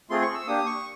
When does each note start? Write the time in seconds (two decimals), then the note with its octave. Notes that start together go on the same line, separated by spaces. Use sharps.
0.10 A3 C4 F4 G#4 C6
0.22 C#6
0.34 E6
0.47 A#3 D4 G4 D#6
0.66 C#6